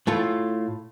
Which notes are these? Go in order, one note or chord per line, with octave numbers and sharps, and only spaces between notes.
A2 A3 F4